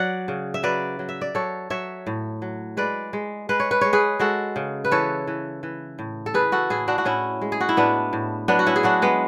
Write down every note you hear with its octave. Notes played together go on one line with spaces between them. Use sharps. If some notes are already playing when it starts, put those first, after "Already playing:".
Already playing: F#3 D5 F#5
C#3
E5
F#3 B4 D5
F#3
E5
D5
F#3 A4 C#5
F#3 C#5 E5
A2
F#3
G#3 B4 D5
G#3
G#3 B4
C#5
B4
G#3 C#5
G#4 B4
G#3 F#4 A4
C#3
B4
E3 A4 C#5
E3
E3
A2
A4
E3 G#4 B4
F#4 A4
A2 E4 G#4
D4 F#4
F#4
A2 C#4 E4
G#3
G#4
F#4
E4
A2 B3 D4
A2
F#3 B3 D4
F#4
C#4 E4
G#4
F#3 D4 F#4
G#3 B3